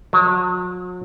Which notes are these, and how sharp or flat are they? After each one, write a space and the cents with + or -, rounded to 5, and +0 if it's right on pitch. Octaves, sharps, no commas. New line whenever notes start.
F#3 -40